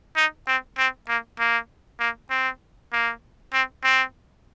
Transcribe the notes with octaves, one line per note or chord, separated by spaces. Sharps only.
D#4
C4
C4
A#3
A#3
A#3
C4
A#3
C4
C4